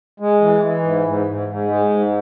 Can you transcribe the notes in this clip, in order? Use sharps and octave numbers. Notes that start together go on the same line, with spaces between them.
G#3
E3
E3
G#2
G#2
G#2
G#2
G#3
G#2